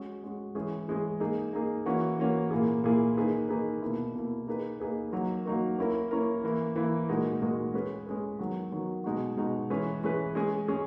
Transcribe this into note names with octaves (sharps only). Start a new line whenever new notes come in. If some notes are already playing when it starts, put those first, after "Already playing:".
Already playing: G#3 C#4 F#4
G#3 C#4 F#4
E3 G#3 C#4 G#4
E3 G#3 C#4 G#4
A#3 D#4 G#4
A#3 D#4 G#4
E3 A#3 C#4 F#4
E3 A#3 C#4 F#4
A#2 A#3 E4 G#4
A#2 A#3 E4 G#4
D#3 A#3 D#4 G#4 B4
D#3 A#3 D#4 G#4 B4
B2 A#3 E4
B2 A#3 E4
A#3 D#4 G#4 B4
A#3 D#4 G#4 B4
F#3 A#3 D#4 F#4 A#4
F#3 A#3 D#4 F#4 A#4
A#3 C#4 E4 A#4
A#3 C#4 E4 A#4
E3 A#3 E4
E3 A#3 E4
A#2 G#3 D#4 F#4 A#4
A#2 G#3 D#4 F#4 A#4
G#3 C#4 G#4 B4
G#3 C#4 G#4 B4
D#3 F#3 B3 F#4
D#3 F#3 B3 F#4
B2 G#3 D#4 F#4
B2 G#3 D#4 F#4
E3 G#3 C#4 G#4 B4
E3 G#3 C#4 G#4 B4
G#3 C#4 G#4
G#3 C#4 G#4